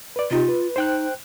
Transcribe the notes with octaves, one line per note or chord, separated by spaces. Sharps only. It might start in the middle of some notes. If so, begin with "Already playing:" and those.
B4 D5
C3 D#4 F4 G4
B4
D#4 C5 G5 F#6